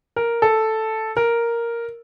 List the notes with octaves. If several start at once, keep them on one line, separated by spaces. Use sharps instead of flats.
A#4
A4
A#4